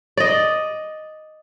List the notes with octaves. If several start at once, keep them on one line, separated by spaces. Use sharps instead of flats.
D5 D#5